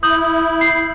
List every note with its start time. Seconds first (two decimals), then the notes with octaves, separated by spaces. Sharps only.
0.03 E4 D#6 G6 F#7
0.61 C7